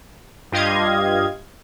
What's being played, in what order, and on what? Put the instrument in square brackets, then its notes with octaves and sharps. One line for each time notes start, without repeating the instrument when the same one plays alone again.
[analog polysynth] G2 F4 G4 D#5 F5 G#6